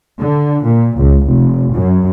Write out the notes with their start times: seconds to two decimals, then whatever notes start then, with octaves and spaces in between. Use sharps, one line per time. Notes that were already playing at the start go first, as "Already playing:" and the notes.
0.20 D3
0.65 A#2
0.97 C#2
1.26 F1
1.74 F#2